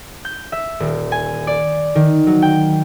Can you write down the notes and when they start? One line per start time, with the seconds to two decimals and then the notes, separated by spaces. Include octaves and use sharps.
0.25 G6
0.52 E5
0.80 D#1
1.12 G#5
1.47 D5
1.95 D#3
2.27 F#3
2.42 G5